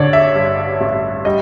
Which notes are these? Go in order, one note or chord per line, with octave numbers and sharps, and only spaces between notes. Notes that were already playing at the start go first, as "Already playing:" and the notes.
Already playing: A1 D3 C#5 D5
E5
G2
A1
G3 D#5